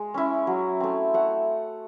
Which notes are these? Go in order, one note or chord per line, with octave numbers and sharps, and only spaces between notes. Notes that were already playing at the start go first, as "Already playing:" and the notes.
Already playing: G#3
C#4 E4
F#3
A3 C4
A3 F#5